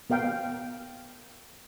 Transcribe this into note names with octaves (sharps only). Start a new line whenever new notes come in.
B3 A#4 F5 G5